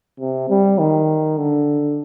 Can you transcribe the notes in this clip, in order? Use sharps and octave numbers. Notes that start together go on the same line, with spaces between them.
C3
G3
D#3
D3